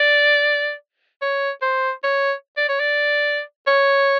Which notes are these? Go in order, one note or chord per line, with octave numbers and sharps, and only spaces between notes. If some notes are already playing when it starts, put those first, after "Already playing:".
Already playing: D5
C#5
C5
C#5
D5
C#5
D5
C#5